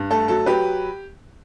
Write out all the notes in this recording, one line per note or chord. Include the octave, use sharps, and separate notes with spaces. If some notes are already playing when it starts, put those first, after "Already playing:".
Already playing: G2
A3 A4
F#3 A4
F#3 G4 B4